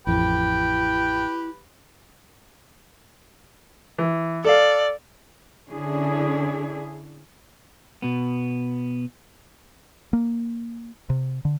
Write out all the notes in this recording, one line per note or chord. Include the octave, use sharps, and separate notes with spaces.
A1 F2 E4 G4 B4 G5
E3
A4 D5 F5
D3 C#4 D4 E4 G#4
B2 B3
A#3
C3
D3